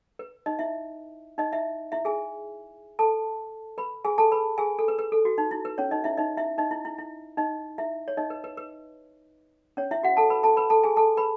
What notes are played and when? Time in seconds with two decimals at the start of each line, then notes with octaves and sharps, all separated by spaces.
0.19 B4
0.46 D#4 D#5
0.59 E4 E5
1.38 D#4 D#5
1.52 E4 E5
1.92 E4 E5
2.05 G#4 G#5
2.99 A4 A5
3.78 B4 B5
4.05 G#4 G#5
4.18 A4 A5
4.32 B4 B5
4.58 G#4 G#5
4.79 A4
4.88 B4
4.99 B4
5.12 A4
5.25 F#4
5.38 D#4
5.51 E4
5.65 B4
5.78 C#4 C#5
5.91 D#4 D#5
6.04 E4 E5
6.17 D#4 D#5
6.37 E4 E5
6.58 D#4 D#5
6.71 E4
6.85 E4
6.98 E4
7.37 D#4 D#5
7.78 E4 E5
8.08 C#5
8.17 D#4 D#5
8.30 B4
8.44 B4
8.57 B4
9.77 C#4 C#5
9.91 E4 E5
10.03 F#4 F#5
10.17 A4 A5
10.30 B4 B5
10.43 A4 A5
10.57 B4 B5
10.70 A4 A5
10.84 G#4 G#5
10.97 A4 A5
11.17 B4 B5